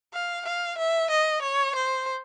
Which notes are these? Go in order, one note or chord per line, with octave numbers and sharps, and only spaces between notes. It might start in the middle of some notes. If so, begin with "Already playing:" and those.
F5
F5
E5
D#5
C#5
C5